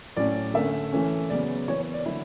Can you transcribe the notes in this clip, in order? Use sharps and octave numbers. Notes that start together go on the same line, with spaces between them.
A2 F#3 C#4 D5
D3 A3 C#4 E5
E3 A3 C#4
C#3 F#3 B3 D5
E3 B3 C#5
C#5
D5
D3 F#3 E4